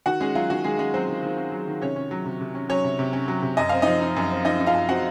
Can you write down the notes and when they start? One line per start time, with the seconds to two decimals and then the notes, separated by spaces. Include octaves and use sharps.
0.06 D#3 F#4 F#5
0.20 G#3 C#4 G#4
0.35 F#3 F4
0.50 D#3 F#4
0.64 D#3 G#3 G#4
0.79 G#3 C#4 G#4
0.94 F#3 C4 C5
1.09 D#3
1.23 D#3
1.37 C#4
1.52 F#3
1.67 D#3
1.81 C3 C#4 C#5
1.96 C#4
2.11 F#3
2.26 C3
2.41 C3
2.55 C#4
2.69 F#3 C#4 C#5
2.84 C3
2.99 C3
3.13 C#4
3.28 F#3
3.42 C3
3.57 F#2 D#5
3.69 C4 F5
3.82 F3 D#4 D#5
4.01 D#4
4.16 F#2
4.30 C4
4.45 F3 D#4 D#5
4.60 D#4
4.66 F4 F5
4.75 F#2
4.89 C4 F#4 F#5